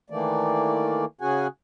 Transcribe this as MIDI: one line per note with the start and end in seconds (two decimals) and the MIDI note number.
0.10 1.05 51
0.10 1.05 52
0.10 1.05 57
0.10 1.05 58
0.10 1.05 74
1.21 1.47 49
1.21 1.47 61
1.21 1.47 66
1.21 1.47 68
1.21 1.47 78
1.21 1.47 80